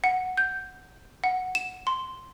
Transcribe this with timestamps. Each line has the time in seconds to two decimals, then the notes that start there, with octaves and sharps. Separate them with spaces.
0.04 F#5
0.37 G6
1.24 F#5
1.55 E7
1.87 C6